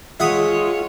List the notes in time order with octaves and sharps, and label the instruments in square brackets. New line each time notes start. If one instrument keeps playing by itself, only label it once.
[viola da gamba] G#3 C#5 [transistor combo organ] F4 [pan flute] G#4 [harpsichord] E5 F#5 D#6